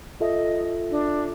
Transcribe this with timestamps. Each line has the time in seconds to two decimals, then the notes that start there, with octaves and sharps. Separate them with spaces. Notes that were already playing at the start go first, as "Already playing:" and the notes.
0.21 F4 A4 D#5 E5
0.91 D4